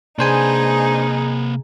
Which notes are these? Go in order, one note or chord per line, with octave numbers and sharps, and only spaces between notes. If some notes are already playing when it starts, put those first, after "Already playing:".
C3 A#3 D4 D#4 G#4 B4 C5 G#5